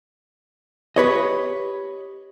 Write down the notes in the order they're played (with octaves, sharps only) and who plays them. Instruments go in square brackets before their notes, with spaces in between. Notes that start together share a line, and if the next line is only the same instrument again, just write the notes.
[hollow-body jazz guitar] G4 B4 C#5 D#5